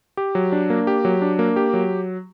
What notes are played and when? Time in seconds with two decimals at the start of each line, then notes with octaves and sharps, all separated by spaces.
0.17 G4
0.35 F#3
0.52 D4
0.70 A#3
0.87 G4
1.05 F#3
1.22 D4
1.39 A#3
1.56 G4
1.74 F#3